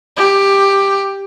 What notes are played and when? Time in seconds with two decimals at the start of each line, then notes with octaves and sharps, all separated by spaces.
0.17 G4